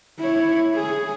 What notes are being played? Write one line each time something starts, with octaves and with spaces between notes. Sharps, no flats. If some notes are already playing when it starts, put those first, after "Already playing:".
E4 C#5
G#4